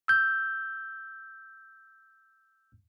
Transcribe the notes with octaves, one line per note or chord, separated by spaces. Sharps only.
E6 G6